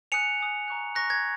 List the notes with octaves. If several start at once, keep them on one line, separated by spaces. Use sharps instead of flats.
G#5 D#6 F#6 C#7 F7
G#5 D#6 F#6
A#5 C#6 F#6
A#5 C#6 F#6 A#6
G#6